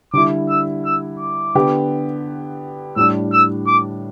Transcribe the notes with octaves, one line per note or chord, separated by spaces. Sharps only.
D3 G3 E4 D6
E6
E6
D6
D3 B3 G4
A2 G3 D4 E6
E6
D6